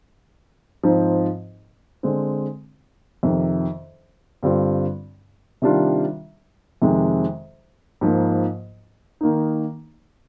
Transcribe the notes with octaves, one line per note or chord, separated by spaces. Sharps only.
G#2 F3 C4 D#4
D3 G#3 C4
F2 C3 D#3
G2 D3 G3 C4 F4
C3 D#3 G3 D4 F4
F2 C3 D#3 G#3
G#2 F3 A#3
D#3 A#3 D#4